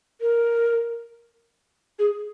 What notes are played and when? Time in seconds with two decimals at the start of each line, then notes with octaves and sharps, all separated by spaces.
0.21 A#4
1.99 G#4